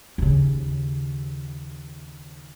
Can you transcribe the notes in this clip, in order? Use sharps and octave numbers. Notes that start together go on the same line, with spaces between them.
D#2 C#3